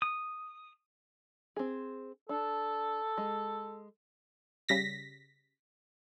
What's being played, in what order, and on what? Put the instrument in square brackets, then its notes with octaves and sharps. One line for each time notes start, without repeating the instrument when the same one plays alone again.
[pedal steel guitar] D#6
[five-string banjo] C4 G#4
[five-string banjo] D4 [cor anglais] A4
[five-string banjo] G#3
[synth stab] C#3 G3 A#6 B6